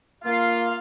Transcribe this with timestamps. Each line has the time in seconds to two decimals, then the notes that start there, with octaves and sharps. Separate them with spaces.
0.24 A#3 F4 F5